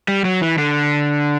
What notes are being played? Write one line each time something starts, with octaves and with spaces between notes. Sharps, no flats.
G3
F#3
E3
D3